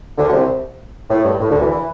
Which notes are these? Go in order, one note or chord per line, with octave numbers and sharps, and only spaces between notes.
D2 D3
D3
C2 C3
A2
G2
A2
D2 D3
E2 E3
E3